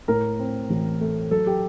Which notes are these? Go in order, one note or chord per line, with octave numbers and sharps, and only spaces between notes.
A2 A#4
C4
A1
A3
F#3 A4
G4